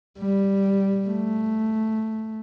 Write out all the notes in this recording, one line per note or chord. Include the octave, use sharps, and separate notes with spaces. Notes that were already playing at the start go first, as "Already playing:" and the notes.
G3
A3